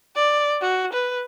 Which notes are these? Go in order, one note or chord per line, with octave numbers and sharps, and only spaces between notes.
D5
F#4
B4